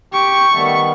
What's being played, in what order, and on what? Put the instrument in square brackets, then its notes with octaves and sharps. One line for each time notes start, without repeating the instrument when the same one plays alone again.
[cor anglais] G4 [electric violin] C#6
[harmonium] D#3 G3 B3 [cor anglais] A3